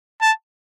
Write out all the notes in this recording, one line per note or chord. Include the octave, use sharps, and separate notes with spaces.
A5